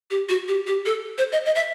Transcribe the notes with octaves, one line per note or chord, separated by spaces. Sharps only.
G4
F#4
G4
G4
A4
C5
D#5
D#5
E5